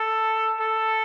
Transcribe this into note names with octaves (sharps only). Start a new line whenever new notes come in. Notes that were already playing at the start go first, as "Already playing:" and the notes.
Already playing: A4
A4